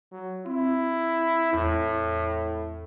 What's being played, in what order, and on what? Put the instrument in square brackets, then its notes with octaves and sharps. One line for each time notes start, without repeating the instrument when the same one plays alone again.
[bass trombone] F#3
[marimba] C4 [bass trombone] E4
[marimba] E2 [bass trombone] A2